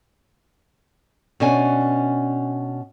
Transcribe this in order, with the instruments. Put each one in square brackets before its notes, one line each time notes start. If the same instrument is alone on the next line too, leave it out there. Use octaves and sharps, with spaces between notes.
[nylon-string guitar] B2 C#4 D4 G#5